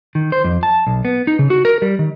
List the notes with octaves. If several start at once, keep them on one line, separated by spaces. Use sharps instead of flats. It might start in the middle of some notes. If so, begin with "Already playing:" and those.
D#3
C5
F2
A5
B1
B3
D#4
C#3
F#4
A#4
G3
D#3